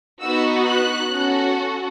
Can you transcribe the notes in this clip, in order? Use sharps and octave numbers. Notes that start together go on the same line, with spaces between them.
B3 D#4 F#4 E6
F#6
C#4 F#4 A4